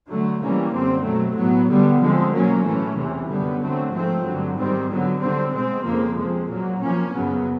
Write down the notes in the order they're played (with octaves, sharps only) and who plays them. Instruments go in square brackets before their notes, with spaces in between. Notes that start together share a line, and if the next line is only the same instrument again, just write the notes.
[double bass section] D3 F#3 A3
C3 E3 G3 A#3 C#4
F#2 D3 G3 C4
B2 F#3 A3
A2 F#3 B3
D3 G3 B3
D3 F3 G#3 C4
B2 F#3 A#3 C#4
A2 E3 A3 C#4
E2 C3 E3
F#2 D3 G3 B3
D3 F#3 A3 C4
G#2 F3 A3 C4
G2 D3 F#3
G#2 D#3 G3 C4
D3 F#3 B3
D3 G3 C4
B2 G#3 C4
F2 C#3 F3 A#3
C3 F3 G#3
A#2 F#3 A#3
C3 F3 A#3 C#4
F#2 C#3 F#3 B3